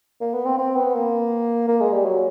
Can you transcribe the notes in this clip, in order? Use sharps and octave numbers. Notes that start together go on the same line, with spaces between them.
A#3
B3
C4
C4
B3
A#3
A#3
G#3
G3
F#3